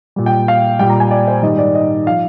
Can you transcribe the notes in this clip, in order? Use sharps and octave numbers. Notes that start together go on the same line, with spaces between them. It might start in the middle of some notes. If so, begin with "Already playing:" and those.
A#2 G3
G5
F5
A#2 G3 G5
A#5
G#5
D5
C5
G#2 D#3 G3 D#5
D5
D#5
F3 F5